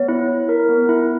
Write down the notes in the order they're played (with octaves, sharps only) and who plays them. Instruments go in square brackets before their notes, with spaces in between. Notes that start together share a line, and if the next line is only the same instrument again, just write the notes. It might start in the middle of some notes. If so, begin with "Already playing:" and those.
Already playing: [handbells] B3 [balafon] C#5
[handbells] E4
E4
A#4
B3
E4